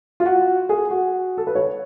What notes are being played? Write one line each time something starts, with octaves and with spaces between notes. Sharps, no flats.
F4
F#4
G#4
F#4
A4
B4
C#5